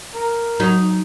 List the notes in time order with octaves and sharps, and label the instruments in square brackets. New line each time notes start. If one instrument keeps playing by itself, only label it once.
[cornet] A#4
[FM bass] F#3 [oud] D#4